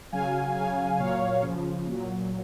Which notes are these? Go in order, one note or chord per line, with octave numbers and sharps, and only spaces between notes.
C#3 F#3 F5 G#5
C#3 F#3 F5 G#5
A#2 F#3 C#5 F5
C#3 F3
A#2 F#3